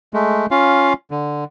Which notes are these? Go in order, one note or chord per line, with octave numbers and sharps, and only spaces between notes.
G#3 A3
C#4 F4 F5
D3